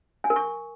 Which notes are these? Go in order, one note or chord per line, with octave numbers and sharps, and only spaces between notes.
G#5
A#4
C#6